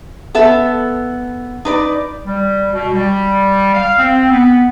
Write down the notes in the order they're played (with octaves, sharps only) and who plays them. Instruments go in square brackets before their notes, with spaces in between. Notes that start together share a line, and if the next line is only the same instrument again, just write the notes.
[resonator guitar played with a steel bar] B3 A4 E5
D#4 B4 D5
[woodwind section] G3
B2
G3
F5
C4
B3